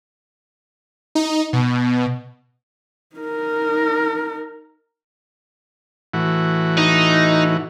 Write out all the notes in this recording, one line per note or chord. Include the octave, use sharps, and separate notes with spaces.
D#4
B2
D#4 A#4
A2 E3 F#4
D#4